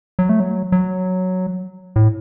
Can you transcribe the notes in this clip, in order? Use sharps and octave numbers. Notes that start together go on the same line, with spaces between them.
F#3
A3
F#3
F#3
A2